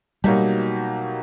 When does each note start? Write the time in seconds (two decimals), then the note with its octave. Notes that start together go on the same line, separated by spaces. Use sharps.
0.24 B2 F#3 G3 A#3 D#4 G4